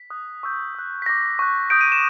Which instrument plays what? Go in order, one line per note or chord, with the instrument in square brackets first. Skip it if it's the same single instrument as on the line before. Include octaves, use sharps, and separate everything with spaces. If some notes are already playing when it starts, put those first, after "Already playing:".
Already playing: [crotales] B6
D#6 F#6
C#6 E6 G6
D#6 F#6
B6
D6 G6 A#6
C#6 F#6
D#6 G6 D7
D#7
E7